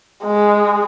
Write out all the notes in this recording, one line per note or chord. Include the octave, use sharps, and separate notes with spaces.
G#3